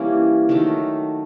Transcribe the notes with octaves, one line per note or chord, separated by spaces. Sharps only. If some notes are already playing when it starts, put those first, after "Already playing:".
Already playing: E3 G3 A#3 C#4
D#3 F#3 A3